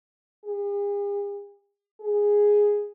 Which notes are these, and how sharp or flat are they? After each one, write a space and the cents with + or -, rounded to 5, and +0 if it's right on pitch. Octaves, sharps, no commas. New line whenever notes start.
G#4 -45
G#4 -5